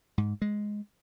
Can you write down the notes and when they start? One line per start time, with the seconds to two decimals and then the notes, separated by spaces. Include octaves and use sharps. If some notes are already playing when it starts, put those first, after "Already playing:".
0.18 G#2
0.42 G#3